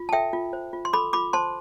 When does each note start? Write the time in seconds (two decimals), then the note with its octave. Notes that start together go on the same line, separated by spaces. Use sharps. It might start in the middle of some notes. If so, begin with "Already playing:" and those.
Already playing: F4
0.09 A5
0.13 A4 E5 G5
0.33 F4
0.53 C5
0.73 F4
0.85 C6
0.93 A4 B5 D6
1.13 F4 B5 D6
1.33 C5 A5 C6